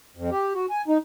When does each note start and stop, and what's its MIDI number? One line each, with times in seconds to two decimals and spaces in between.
0.16 0.30 41
0.31 0.53 67
0.54 0.66 66
0.70 0.82 80
0.88 0.98 63